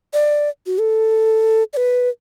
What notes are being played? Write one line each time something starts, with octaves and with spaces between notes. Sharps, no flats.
D5
F#4
A4
D5
B4